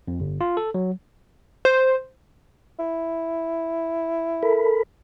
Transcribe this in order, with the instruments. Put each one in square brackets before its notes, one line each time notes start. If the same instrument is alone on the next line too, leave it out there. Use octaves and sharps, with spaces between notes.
[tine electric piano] F2
G1
F4
A4
F#3
[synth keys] C5
[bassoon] E4
[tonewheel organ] A4 A#4 B5